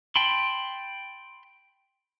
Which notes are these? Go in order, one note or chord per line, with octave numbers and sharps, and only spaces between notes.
G5 A5 B5 C6